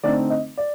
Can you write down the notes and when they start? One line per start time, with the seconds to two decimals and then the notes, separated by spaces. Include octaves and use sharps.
0.03 D3 A3 C4 D#4 D5
0.30 D#5
0.57 D5